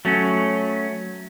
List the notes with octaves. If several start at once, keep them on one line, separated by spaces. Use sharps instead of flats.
F#3 A3 C#4